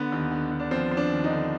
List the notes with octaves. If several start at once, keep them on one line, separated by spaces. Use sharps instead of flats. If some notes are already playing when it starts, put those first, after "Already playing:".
Already playing: D3 B3
D#2
D3
D#2
D4
F3 C4
F3
D4
D#2
D#4
D3